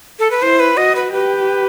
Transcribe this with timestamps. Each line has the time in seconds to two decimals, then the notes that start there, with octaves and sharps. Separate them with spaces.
0.19 A4
0.31 B4
0.42 E4 C5
0.60 B4
0.77 F#4 D#5
0.96 B4
1.13 G4 B4